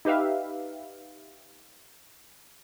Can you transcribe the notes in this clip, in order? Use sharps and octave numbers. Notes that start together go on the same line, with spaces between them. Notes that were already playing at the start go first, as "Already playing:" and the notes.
D#4 G4 B4 E5 F5